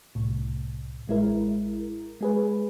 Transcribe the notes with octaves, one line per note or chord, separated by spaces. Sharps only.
C2 A2
A1 G#3 E4 A#4
G#3 G#4 B4